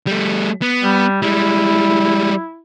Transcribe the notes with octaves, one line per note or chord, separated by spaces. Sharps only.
G3 A3
B3
G3
G3 G#3 E4